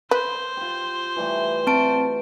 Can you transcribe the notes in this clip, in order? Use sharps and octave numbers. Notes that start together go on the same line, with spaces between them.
B4 C5
F4 G4
E3 G3 A3
C4 A5 D7